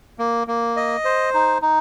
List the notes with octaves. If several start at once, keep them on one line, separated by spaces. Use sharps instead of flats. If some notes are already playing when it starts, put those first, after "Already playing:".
A#3
A#3
D#5
C5
D#4
D#4